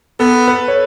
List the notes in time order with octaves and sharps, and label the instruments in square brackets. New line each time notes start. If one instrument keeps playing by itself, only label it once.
[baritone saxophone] B3 [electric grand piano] A4
[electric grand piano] B4
C#5